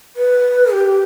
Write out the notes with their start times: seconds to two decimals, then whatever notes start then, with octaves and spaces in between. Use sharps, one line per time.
0.16 B4
0.72 G4